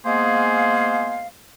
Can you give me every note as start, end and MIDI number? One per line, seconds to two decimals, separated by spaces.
0.06 1.27 56
0.06 1.27 58
0.06 1.27 59
0.06 1.27 68
0.06 1.27 72
0.06 1.27 77